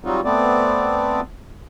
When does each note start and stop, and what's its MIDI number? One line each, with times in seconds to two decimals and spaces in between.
0.04 0.20 54
0.04 0.20 55
0.04 0.20 60
0.04 0.20 63
0.04 0.20 65
0.04 0.20 66
0.25 1.20 57
0.25 1.20 59
0.25 1.20 60
0.25 1.20 74